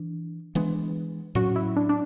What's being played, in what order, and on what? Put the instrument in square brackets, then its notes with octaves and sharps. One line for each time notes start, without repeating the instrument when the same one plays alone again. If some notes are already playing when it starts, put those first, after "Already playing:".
Already playing: [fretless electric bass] E3 D4
E3 G#3 B3 D4
[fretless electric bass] A2 F#3 C#4 [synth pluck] F#4
[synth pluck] E4
D4
D4